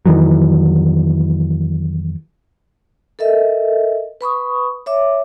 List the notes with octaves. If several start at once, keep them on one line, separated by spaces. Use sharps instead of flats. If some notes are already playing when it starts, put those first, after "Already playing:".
F2 D#3 E3 F#3
A4 A#4 D#5 E5
B4 B5 C#6 D#6
C#5 E5 D6